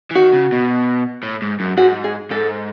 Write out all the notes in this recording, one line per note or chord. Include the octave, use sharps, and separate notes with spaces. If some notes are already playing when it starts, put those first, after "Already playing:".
E3
D#3 F#4
C#3
B2
A2
G#2
F#2
G#2 F#4
G#4
G#2 A4